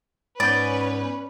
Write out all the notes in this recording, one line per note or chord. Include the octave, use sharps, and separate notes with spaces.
G#2 B3 C#4 B4 D5 G6